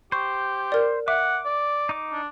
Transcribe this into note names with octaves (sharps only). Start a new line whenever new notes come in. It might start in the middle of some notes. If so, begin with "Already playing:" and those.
G4 C5 C#6
A#4 D5
E5 F#5 D6
D5
D#4 D6
D4